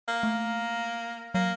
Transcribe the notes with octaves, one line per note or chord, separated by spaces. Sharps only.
A#3
A3
F#3 A#3